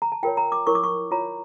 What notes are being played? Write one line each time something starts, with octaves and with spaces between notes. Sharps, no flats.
A#5
A5
F4 A#4 C#5 G5
A#5
D6
E4 A#4 C#5 C#6
D6
C#6
F4 C#5 A#5